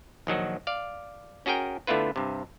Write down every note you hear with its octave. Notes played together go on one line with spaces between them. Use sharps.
A#1 D#3 F#3 F#4
D5 F5
C#4 F#4 G#4 A#4 G5
D3 A3 B3 E4 F4 B4
G2 C3